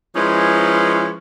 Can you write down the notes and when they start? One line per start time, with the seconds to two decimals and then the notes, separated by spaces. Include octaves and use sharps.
0.15 F3 G#3 C#4 D#4 E4 B4